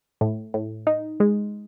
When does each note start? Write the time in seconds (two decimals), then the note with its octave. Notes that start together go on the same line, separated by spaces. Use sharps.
0.21 A2
0.54 A2
0.87 D#4
1.20 G#3